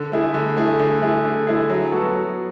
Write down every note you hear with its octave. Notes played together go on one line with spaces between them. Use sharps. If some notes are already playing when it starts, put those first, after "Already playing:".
Already playing: D3
A3 E4 G#4
D3
A3 E4 G#4
D3
A3 E4 G#4
D3
A3 E4 G#4
F#3
B3 F#4 A4
F#3